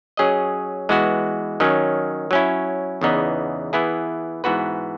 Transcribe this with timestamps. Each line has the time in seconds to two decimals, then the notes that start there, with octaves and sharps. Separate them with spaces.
0.17 F#3 C#4 G#4 D#5
0.89 E3 G#3 B3 F#4
1.60 D#3 F#3 C#4
2.31 F#3 C#4 E4
3.01 E2 C#3 E3 B3 D#4
3.73 E3 B3 E4 G#4
4.44 G#2 E3 B3 F#4 B4